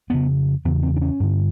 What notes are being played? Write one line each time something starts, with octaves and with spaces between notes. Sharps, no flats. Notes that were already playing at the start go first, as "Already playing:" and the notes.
F2 C#3 B3
E2 C#3 B3
C4
D4
C#4
G2 D3